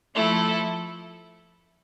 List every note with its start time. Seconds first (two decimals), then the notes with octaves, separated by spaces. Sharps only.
0.16 F3 A3 E4 A4